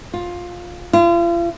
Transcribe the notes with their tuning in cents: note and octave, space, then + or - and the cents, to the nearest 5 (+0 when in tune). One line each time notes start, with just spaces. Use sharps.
F4 +15
F4 -40